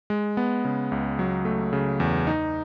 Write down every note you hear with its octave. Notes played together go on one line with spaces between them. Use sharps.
G#3
B3
C#3
C#2
F#3
A3
C#3
E2
D#4